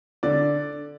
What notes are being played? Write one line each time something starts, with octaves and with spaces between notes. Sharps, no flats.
D3 D5